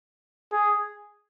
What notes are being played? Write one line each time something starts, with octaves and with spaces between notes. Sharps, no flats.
G#4